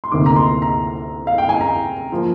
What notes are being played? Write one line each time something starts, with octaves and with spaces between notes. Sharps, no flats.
C6
D2 C3 D#3 A#3 D6
A#5
C6
A#5
F5
G5
G#5
A#5
F3 A#3